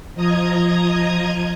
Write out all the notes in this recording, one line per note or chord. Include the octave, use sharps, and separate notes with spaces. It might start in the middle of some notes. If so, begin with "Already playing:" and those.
F3 D#5 A#5 D#6 G#6